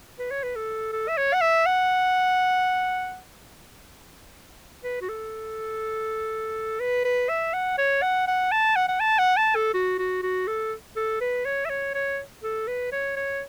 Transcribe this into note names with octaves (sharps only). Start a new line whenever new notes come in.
B4
C#5
B4
A4
A4
E5
C#5
F#5
E5
F#5
B4
F#4
A4
B4
B4
E5
F#5
C#5
F#5
F#5
A5
F#5
F#5
A5
F#5
A5
A4
F#4
F#4
F#4
A4
A4
B4
C#5
E5
C#5
C#5
A4
B4
C#5
C#5